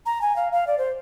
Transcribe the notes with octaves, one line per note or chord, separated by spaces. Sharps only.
A#5
G#5
F5
F5
D5
C5